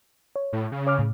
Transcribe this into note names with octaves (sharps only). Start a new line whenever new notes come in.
C#5
A2
C#3
C#5 D6 F6
A2